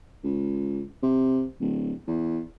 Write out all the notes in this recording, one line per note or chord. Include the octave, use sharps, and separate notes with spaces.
C#2
C3
D1
E2